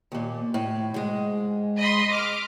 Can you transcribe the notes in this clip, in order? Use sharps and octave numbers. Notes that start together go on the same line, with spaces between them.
D#2 A#2
A2
G#2 G#3
D#5 B5 C6
D6 F6